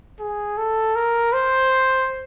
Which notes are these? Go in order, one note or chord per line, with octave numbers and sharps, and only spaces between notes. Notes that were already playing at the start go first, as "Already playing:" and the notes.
G#4
A4
A#4
C5